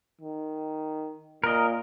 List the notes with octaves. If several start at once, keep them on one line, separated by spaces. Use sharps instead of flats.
D#3
A#2 A#4 D#5